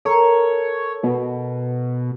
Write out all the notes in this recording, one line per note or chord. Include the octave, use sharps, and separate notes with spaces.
A4 A#4 C#5
B2